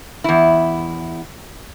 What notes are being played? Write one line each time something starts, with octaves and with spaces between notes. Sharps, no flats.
E2 E4